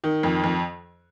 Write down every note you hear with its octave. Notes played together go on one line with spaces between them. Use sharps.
D#3
F2
F2